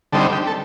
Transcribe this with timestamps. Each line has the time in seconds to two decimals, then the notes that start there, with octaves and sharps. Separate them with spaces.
0.13 D3 G3 C4 D#4 A4
0.32 G4
0.47 A4